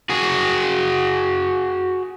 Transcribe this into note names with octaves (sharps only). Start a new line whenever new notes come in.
F#4 G#4